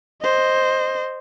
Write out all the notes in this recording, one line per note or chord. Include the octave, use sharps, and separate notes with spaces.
C5 D#5